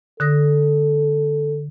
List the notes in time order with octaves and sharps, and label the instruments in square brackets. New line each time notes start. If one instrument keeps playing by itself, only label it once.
[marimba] D3 D#6 A#6 [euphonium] A4